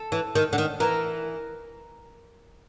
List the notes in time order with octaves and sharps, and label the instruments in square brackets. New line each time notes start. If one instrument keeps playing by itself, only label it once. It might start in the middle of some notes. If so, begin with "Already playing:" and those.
Already playing: [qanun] A4
[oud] E3
D#3
D3
D#3
[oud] E3 [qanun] A#4